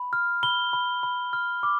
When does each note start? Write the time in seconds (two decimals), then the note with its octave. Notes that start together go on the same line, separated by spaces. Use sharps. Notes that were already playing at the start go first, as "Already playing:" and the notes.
Already playing: B5
0.13 F6
0.43 B5 G7
0.73 B5
1.03 B5
1.33 F6
1.63 D6